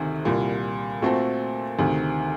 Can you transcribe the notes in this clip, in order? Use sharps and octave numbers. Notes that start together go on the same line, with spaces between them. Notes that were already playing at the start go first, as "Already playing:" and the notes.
Already playing: D2 C3 D#3
C2 A#2 G3
A#2 A3 C4 F#4 A4
D2 C3 D#3